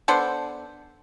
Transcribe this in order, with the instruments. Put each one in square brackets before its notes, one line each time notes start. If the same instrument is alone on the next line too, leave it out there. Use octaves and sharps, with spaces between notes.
[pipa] B3 D4 A4 C5